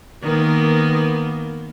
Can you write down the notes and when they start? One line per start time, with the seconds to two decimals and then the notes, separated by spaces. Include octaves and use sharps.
0.23 D#3 A#3 B3